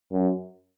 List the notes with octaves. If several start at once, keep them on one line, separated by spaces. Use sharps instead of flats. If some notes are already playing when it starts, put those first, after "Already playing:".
F#2